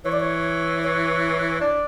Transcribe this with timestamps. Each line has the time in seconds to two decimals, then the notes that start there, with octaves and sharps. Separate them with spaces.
0.05 E3 C#5
0.12 D5
0.20 C#5
0.84 C#5
1.60 D4 D5